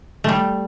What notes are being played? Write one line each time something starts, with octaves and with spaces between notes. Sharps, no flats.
G3 A3